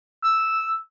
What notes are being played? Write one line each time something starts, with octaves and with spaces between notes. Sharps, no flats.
E6